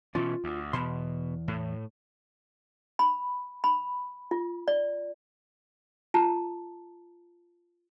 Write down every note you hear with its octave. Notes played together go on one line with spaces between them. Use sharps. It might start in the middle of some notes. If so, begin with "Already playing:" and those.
B2 E3 C#4 F4
D2
E2 B2 B5 C6
A2
B5
B5
F4
D5
F4 A5 A#5